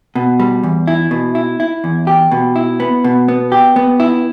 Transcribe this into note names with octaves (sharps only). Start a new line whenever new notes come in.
B2
G3
E2
E4
B2
E4
E4
E2
G4
B2
E4
B3
B2
B3
G4
B3
E4